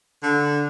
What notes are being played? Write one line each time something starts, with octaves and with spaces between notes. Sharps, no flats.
D3